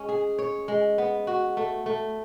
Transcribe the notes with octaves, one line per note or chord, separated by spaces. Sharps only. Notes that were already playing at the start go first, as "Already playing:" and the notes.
Already playing: G#3 C#4
G#4
C#5
G#3
B3
F#4
A3
A3